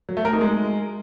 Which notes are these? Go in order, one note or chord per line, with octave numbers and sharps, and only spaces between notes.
F#3
A3
A#4
D#4
G#3